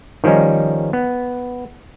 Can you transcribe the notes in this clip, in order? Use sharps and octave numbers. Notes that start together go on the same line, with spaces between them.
D#3 F3 G3 C#4 D#4
B3